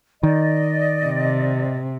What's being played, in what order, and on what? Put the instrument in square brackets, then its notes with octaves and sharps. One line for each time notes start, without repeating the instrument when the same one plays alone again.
[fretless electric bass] D#3 [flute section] D5 D#5
[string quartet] C3